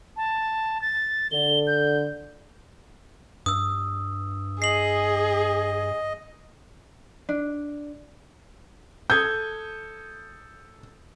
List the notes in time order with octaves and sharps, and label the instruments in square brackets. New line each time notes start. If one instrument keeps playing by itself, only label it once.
[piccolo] A5
A6
[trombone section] D3 [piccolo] G7
[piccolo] G6
[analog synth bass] G2 [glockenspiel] D#6 E6
[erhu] G#4 [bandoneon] D#5 [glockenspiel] C7 F#7
[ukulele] D4
[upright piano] A4 D#6 G#6 [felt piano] G6